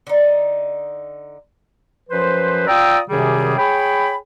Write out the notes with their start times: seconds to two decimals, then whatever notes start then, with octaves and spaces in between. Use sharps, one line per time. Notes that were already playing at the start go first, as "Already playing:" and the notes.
0.07 D3 D#4
2.10 F#2 F3 B4 C5
2.67 F4 D5 G5 A#5 D#6 E6
3.08 F#2 C3 D#3 G3 G#4
3.57 G#4 C#5 G5 B5